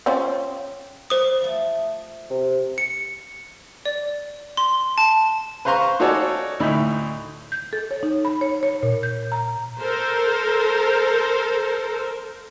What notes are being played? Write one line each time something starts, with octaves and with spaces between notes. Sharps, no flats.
C4 C#4 F4
G3 C4 C5 D#6
F3 A3
C3
C#7
D5
C6
A5
B4 C5 F5 A#5 C6 C#6
D#4 F#4 G#4 A4 C#5 D5
D2 A2 D#4 B5
G6
A4
C#5
D#4
B5
C#5
C#5
A#2
G6
A#5
A4 A#4 C5